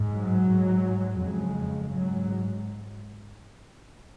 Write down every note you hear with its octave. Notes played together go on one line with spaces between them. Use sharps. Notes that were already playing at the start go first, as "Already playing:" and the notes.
Already playing: G#2
F#3
G#2
F2 C#3 G#3
G#2 F#3